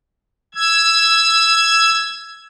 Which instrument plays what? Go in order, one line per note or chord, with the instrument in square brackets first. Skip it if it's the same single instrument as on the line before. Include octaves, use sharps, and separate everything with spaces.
[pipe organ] E6 G#6